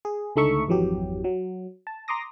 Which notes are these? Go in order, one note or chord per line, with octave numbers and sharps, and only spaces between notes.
G#4
C#2 D3 A3 D#4 E5 C#6
G#1 F2 E3 F#3 G4
F#3
A5
A#5 C6 D6 D#6 A#6